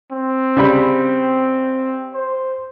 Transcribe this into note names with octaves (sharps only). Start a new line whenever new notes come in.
C4
C#3 G3 B5
C5